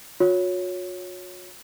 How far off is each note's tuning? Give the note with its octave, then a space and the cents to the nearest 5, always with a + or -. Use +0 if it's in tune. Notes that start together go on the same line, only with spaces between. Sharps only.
F#4 -45 C#5 +0